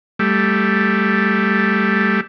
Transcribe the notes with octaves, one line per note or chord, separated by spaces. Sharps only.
G3 A3